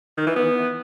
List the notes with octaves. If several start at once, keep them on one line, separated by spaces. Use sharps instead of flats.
D#3
E3
B3